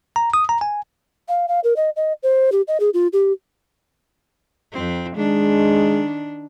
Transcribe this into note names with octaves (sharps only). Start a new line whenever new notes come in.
A#5
D#6
A#5
G#5
F5
F5
A#4
D#5
D#5
C5
G4
D#5
G#4
F4
G4
F2 C4
D#3 G#3 D4